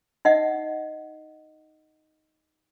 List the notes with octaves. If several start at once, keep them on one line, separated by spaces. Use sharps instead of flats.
D#4 D#5 E5 F#5